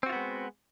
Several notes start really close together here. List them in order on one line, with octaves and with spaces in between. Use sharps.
C4 F#4 F4 B3 G#3